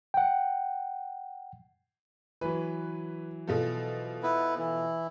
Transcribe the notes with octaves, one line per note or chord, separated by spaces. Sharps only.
F#5 G5
E3 F#3 B4
B2 F3 A4
B3 E4 B4
E3 E4